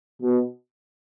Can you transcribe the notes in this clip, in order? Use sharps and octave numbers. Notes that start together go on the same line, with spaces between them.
B2